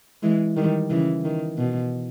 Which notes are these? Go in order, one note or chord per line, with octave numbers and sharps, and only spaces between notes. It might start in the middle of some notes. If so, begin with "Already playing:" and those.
E3 G#3
D#3 G3
C#3 E3
D#3
B2